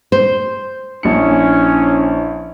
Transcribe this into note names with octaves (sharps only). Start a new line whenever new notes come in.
C5
A#1 C#4 D4 E4 C#7